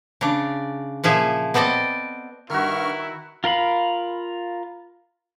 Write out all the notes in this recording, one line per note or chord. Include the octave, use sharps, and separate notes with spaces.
C#3 D4
A#2 F3 G#4 E5
B3 C4 A4 D5 D#5
G2 D#3 E4 F#4 A#5 C#6 F6
F4 A#4 F5 B5